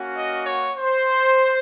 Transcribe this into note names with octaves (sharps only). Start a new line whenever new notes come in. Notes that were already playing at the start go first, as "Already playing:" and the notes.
Already playing: A#3 C#4 F#4
D#5
C#5
C5